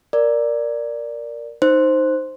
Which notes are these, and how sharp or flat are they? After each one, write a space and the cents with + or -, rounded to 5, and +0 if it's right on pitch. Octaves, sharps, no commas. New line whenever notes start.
A#4 +0 D5 +0
D#4 +0 C5 +0